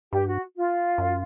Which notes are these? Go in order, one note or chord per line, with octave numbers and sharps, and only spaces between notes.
G2 G4
F#4
F4
F#2